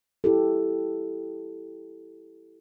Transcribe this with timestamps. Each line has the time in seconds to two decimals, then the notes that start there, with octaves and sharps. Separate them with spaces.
0.24 E4 G4 A4